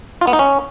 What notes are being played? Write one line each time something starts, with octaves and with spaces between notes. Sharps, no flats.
F4
B3
D#4
C#4